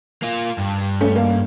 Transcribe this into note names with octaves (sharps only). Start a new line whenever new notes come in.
A#3 F4
G2
A3 C#4
A#3